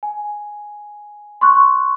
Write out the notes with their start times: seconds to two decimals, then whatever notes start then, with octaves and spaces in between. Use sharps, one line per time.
0.03 G#5
1.41 C6 C#6 F#6